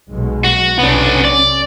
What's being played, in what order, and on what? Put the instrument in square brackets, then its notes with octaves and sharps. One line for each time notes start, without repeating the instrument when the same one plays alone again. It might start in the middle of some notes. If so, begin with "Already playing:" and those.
[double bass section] B1 B2 G#3
[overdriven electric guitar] F#4
[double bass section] B1 C3 C#4 [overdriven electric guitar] B3 D4
[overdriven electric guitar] D5